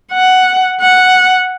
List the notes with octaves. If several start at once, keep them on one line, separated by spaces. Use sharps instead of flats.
F#5
F#5